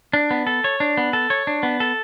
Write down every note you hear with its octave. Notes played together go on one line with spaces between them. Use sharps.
D4
B3
A4
C#5
D4
B3
A4
C#5
D4
B3
A4